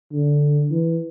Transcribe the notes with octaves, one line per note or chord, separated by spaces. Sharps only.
D3
E3